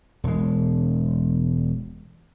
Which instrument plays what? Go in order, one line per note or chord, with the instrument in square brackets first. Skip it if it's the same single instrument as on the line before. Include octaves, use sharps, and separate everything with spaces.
[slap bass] E1 G#3